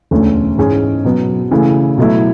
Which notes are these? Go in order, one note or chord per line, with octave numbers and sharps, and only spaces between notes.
E1 D2 D3 A3 C#4
G#2 E3 G#3 C#4 G#4
B2 F#3 B3
C#3 E3 A3
B2 F#3 A3 E4